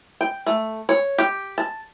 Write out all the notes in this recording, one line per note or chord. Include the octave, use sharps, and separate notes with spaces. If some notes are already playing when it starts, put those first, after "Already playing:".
G5
A3
C#5
G4
A5